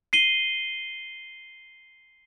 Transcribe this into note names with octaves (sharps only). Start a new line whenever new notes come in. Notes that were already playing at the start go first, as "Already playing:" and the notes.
C7 D#7 G7